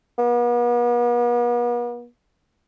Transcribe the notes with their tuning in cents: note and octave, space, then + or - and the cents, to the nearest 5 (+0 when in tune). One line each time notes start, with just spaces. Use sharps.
B3 -45